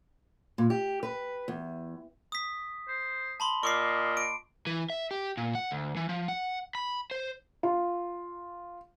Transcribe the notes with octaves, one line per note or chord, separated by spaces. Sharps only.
A#2
G4
B4
E2
D#6 B6
C5
A5 B5 C6
A#2 D#5 C#6 D6 C7
D7
E3
E5
G4
A#2
F#5
D2
E3
F3
F#5
B5
C5
F4